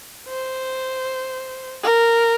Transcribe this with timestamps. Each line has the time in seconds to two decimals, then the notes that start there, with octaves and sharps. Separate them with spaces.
0.29 C5
1.84 A#4